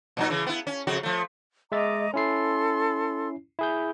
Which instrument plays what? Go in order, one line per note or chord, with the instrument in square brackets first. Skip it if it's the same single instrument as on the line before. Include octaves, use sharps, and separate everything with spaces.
[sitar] A#2 F#3 D#4
C#3 E3
B3 E4
C#4
F2 C#3 F#4
F3 A3
[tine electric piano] G#3 E5 A6 [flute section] D#5 A#5 D6
[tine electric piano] C#4 E4 C7 [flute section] A4 C6
[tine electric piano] E4 G#4 G6